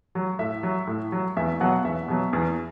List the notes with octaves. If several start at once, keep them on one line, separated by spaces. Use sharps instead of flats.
F#3
A2 E5
F#3
A2
F#3
E2 E5
B2 F#3 F#5
E2 E5
B2 F#3
E2